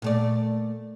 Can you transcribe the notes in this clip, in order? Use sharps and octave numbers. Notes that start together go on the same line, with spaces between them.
A#2 A3 D5